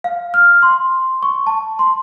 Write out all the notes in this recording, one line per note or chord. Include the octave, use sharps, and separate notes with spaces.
F5
F6
C6
C#6
A5
C6